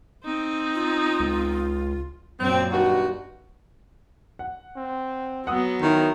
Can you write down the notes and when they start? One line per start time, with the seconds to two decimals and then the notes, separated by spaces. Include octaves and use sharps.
0.24 C4 D#4
0.75 F4
1.20 C#2
2.40 F#2 A#2 C4
2.71 G2 D#3 F#4
4.39 F#5
4.76 C4
5.47 F#3 B3 F#5 D#6 E6
5.82 D#3 E4 A#4 C#5